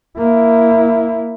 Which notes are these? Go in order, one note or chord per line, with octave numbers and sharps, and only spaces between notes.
A#3 E4